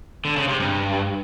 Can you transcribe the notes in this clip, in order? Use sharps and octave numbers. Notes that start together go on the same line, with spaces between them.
D3
C#3
C3
G2